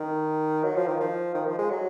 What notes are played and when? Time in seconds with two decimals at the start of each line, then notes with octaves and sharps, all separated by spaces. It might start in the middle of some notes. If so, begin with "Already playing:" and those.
Already playing: D#3
0.64 F#3
0.76 F3
0.88 D#3
1.00 F3
1.34 D#3
1.46 F3
1.58 G#3
1.70 F#3